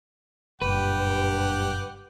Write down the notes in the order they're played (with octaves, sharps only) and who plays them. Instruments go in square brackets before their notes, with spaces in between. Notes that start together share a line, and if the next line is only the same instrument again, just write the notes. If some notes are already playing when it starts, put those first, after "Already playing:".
[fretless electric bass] F#1 A#2 [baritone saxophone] G2 [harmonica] G4 F#5 G5 [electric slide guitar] B4